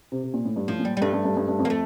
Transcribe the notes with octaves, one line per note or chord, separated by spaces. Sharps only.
C3
C3
A#2
A2
G2
A2 F3
A#2
G3
G3
G2 A3
G2
G2
G2
G2
F2
A#3
A3